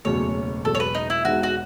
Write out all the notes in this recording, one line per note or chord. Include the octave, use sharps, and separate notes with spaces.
F#1 E2 B2 A3 C#5
E1 E2 B2 F#3 A4
C#5
B4
D#4
E4
E1 E2 B2 G#3 D#4 F#4
F#4